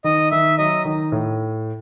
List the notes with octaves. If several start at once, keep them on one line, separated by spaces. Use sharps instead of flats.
D#3 D#5
D#3 E5
F#3 D#5
D#3
A2